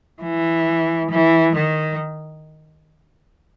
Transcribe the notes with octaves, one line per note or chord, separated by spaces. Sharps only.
E3
E3
D#3